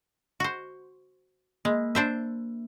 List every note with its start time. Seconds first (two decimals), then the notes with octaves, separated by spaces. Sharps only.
0.40 F#4 C5
1.65 G#3 A#3
1.95 D4 C5 E5